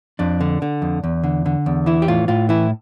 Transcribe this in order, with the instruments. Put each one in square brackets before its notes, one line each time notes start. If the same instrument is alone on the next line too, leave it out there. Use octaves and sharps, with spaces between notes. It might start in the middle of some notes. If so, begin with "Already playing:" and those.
[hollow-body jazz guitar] F2 D4
D3
D3
F2
E2
D3
D3
E2
E3 E4
G4
A2 F4
A2 F4
E3 E4